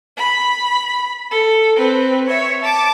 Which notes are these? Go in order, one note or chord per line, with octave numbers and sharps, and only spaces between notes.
B5
A4
C4 B4
C#5 E5
A5 D6